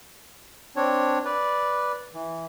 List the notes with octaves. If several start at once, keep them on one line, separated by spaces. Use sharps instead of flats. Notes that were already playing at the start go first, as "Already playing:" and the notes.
C4 D4 C#5
B4 D5
E3